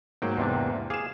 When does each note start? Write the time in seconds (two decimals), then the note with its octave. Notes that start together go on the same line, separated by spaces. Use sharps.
0.22 G#2 F#3 A#3 G5
0.37 E2 C3 D4
0.90 G#4 F5 D6 E7